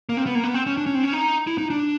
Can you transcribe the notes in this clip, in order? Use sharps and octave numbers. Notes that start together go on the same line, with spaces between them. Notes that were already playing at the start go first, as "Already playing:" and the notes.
A#3
C4
B3
A#3
B3
C4
C#4
D4
C#4
C4
C#4
D#4
E4
D#4
D4